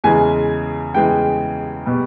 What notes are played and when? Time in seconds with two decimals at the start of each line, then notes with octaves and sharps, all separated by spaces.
0.04 E2 C#3 E3 G#3 G#5
0.95 E2 C#3 E3 G#3 G5
1.86 B2 G3